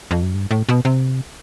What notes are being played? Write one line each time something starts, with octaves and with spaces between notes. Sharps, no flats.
F2
F#2
G2
A2
B2
C3